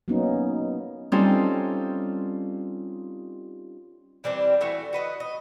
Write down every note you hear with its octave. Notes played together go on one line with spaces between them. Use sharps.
F#3 A#3 B3 C#4 D#4
G3 C4 C#4 D#4 F4 A4
E3 G3 C4 D4
E3 A3 F#4
F#4 B4 D#5
D#5